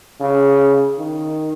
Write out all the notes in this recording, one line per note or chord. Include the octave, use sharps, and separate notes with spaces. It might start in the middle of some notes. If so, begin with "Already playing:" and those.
C#3
D#3